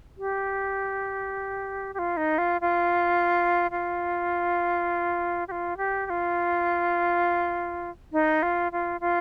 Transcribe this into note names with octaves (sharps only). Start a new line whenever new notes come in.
G4
G4
F4
D#4
F4
F4
F4
G4
F4
G4
G4
F4
D#4
F4
F4
F4